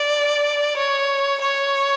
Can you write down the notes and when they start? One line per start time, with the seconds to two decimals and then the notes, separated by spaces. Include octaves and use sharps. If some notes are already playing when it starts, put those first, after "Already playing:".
Already playing: D5
0.77 C#5
1.42 C#5